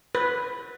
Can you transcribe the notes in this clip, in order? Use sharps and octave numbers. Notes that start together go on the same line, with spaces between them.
B4